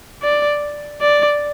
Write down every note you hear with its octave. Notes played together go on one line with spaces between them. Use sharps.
D5
D5